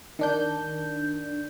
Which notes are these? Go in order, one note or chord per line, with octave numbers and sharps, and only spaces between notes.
D#3 D4 G6